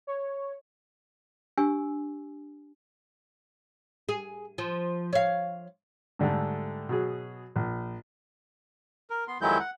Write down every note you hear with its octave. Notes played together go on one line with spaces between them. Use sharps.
C#5
D4 G4 G#5 C#6 E6
G#4
F3
C#5 F5
G#2 D3 G3 A3
B2 F#3 G#4
A#1
A#4
B3 C6
F2 D#3 F#3 G#3 E4 G6
F#5